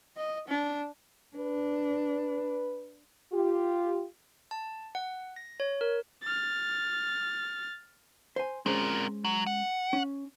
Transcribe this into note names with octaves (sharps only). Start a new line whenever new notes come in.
D#5
D4
D4 B4
F4 G4
A5
F#5
A#6
C#5
A#4
F6 A6
C5 G#5
G#3 C4 C#4 A#4 C5
F#3
F#5
C#4